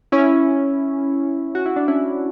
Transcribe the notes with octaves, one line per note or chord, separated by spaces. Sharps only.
C#4 E4
F#4
E4
D4
C#4 E4